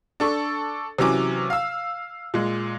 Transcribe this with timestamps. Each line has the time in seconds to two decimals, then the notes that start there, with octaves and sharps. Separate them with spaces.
0.20 D4 A4 C#6
0.98 C3 E3 F#3 C#4 D6
1.50 F5 E6
2.34 A#2 G#3